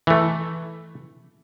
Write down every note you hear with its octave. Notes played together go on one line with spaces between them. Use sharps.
E3 A3